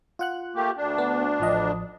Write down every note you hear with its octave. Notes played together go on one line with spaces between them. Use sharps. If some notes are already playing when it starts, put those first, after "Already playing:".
F4 F#5 F#6
A3 A#3 G4
D2 D4
B3
A1 F3 D#5